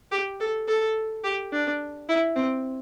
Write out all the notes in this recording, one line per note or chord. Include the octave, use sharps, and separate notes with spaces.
G4
A4
A4
G4
D4
E4
C4